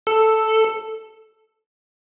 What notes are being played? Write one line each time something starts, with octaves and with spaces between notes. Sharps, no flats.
A4